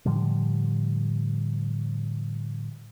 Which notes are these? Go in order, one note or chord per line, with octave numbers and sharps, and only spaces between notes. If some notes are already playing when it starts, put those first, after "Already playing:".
A2 D3 F3 G3